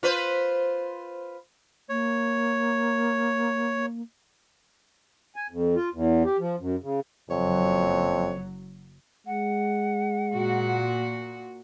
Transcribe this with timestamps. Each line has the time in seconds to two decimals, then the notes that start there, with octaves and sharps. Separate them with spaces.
0.03 F4 B4 C5
1.89 A#3 C#5
5.36 G#5
5.51 F2
5.76 F4
5.94 E2
6.25 G4
6.39 F3
6.60 F#2
6.82 C#3
7.30 F#1 F2 F#3 C#5
9.27 G#3 F#5
10.31 A#2 F#4